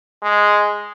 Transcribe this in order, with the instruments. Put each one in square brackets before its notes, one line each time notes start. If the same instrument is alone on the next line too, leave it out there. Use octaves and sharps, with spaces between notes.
[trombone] G#3